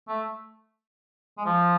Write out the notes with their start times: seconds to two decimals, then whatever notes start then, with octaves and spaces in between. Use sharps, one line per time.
0.08 A3
1.38 G#3
1.45 F3